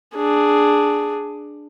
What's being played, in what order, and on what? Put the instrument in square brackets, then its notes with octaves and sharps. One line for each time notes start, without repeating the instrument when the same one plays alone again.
[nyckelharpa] D4 G#4